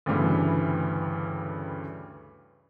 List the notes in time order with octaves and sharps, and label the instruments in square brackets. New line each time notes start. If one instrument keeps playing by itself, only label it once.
[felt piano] D2 G2 C#3 E3 G3